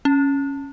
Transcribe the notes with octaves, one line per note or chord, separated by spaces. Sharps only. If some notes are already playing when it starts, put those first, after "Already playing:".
C#4